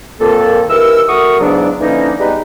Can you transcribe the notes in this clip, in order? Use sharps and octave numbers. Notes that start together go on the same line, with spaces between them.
F2 A#2 D#3 A#3 A4
D#2 E3 A#4 E6
A3 F#4 A#4 C#6 D#6
E2 G#2 C#3 F#3 B3 D4
D3 E3 F3 A#3 C#4 D#4
G3 G#3 B3 D#4 B4